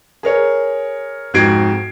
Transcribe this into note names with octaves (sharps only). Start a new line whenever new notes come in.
G#4 A#4 C#5
F2 G#2 F#4 G#6 C7 D7